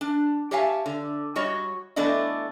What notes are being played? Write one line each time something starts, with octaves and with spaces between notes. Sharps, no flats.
D4
G4 C#5 E5 F5 G#5 A5
D3
G3 F#4 C#5 D#5
E3 A3 B3 D4 D5 D#5